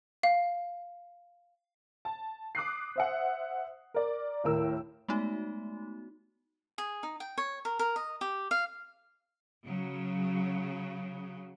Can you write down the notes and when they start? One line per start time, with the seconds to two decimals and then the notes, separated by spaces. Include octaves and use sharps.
0.23 F5
2.05 A5
2.55 D6 D#6 F#6 C7
2.96 C5 E5 F#5
3.94 A#4 D5
4.44 D#2 A2 A#4 E6
5.09 G#3 A3 B3 D#4 F#4
6.78 G#4
7.03 D#4
7.20 G5
7.38 C#5
7.65 A#4
7.79 A#4
7.96 D#5
8.21 G4
8.51 F5
9.66 C#3 F#3